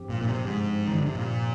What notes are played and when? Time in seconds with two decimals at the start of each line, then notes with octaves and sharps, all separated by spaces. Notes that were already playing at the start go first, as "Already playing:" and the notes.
Already playing: G2 F3 C4 G4
0.09 A#2
0.21 A#2
0.28 C3
0.45 G#2
0.88 D#3
0.96 D3
1.06 C3
1.15 A#2